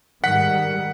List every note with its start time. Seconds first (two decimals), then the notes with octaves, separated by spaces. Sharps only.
0.24 G#2 D#3 G3 F#5 B6